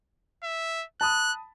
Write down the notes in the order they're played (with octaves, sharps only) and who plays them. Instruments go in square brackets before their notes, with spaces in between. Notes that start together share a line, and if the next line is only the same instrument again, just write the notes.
[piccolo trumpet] E5
[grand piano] A5 B5 D#6 [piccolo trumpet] F#6